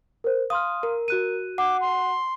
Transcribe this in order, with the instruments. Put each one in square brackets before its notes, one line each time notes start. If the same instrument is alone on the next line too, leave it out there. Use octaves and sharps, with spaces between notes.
[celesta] A#4 C5
[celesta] F5 C6 F6 [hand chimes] D#6
[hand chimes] A#4
[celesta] F#4 F#6 D#7
[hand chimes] F#5 [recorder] D6
[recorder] C6